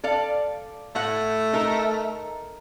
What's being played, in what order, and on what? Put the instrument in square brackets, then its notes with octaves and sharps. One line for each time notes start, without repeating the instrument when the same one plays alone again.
[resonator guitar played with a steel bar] A4 D5 F5
[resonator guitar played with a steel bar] A2 F#5 [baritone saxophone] A3
[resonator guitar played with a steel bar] D#4 A4 A#4